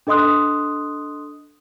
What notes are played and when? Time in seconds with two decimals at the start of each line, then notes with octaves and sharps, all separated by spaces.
0.07 D4 A4 D#5 C6 D#6 F#6